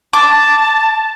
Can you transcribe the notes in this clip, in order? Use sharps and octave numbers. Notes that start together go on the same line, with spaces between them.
A5 D6